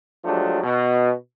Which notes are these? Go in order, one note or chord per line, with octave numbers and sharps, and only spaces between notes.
F3 F#3 G#3 A3 D4 G4
B2